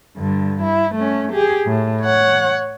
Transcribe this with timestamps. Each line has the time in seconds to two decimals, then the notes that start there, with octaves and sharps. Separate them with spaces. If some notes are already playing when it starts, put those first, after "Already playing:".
0.17 G2 D3
0.62 E4
0.95 A3 C#4
1.32 G4 G#4
1.67 A2
2.02 C#5 F#5